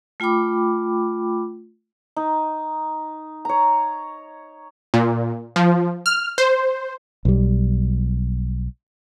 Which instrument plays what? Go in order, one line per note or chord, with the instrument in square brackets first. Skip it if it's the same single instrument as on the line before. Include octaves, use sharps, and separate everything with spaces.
[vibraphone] A3 F4 G5 B5 D6
[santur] D#4
C#5 A#5
[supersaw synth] A#2
F3
F6
C5
[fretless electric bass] B1 G3